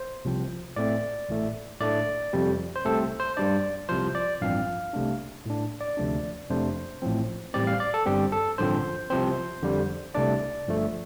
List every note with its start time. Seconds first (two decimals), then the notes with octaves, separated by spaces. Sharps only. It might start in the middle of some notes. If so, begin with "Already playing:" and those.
Already playing: C5
0.25 C2 C3 F3 C4
0.76 A2 A3 C4 D5
1.29 A1 A2 A3
1.81 A2 A3 D4 D5
2.33 F2 C3 G3 C4
2.76 C5
2.85 C2 C3 A3 C4 A4
3.20 C5
3.37 G2 G3 D4 D5
3.89 C2 C3 F3 C5
4.15 D5
4.42 A1 G2 F3 C4 F5
4.93 C2 C3 A3 D4
5.46 A2 A3 D4
5.81 D5
5.97 D2 C3 F3 A3 D4
6.50 F2 C3 A3 D4 C5
7.02 A1 A2 F3 C4
7.54 A1 A2 G3 C4 D5
7.67 F5
7.80 D5
7.94 A4
8.06 G1 G2 G3 C4 G4
8.32 A4
8.58 A1 G2 D3 F3 C4 C5
9.10 C2 C3 F3 C4 C5
9.63 F2 D3 G3
10.15 C2 C3 A3 D4 D5
10.67 G1 G2 F3 A3